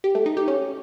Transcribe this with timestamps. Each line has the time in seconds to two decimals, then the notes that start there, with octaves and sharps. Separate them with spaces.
0.04 G4
0.15 A3
0.26 D#4
0.37 G4
0.48 C#4